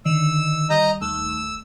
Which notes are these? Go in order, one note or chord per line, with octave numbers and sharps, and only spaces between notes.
D3 D#3 E6
G3 D#5 A#5 G6
D#2 A3 E6